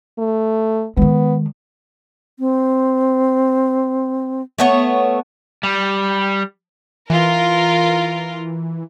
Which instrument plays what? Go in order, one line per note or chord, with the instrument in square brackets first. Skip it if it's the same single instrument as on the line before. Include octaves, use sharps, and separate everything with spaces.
[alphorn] A3
[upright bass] D#3 G#3 [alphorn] B3
[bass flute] C4
[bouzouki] A3 B3 C#5
[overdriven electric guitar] G3
[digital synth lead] E3 [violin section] F4 A#4